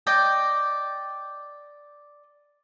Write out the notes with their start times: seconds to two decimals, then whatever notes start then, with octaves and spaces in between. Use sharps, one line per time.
0.07 D5 D#5 G5